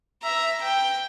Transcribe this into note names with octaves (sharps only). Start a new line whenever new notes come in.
E5 A#5
G5